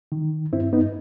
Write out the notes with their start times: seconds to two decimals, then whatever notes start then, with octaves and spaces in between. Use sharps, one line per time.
0.12 D#3
0.53 G2 C4 E4
0.73 B3 D#4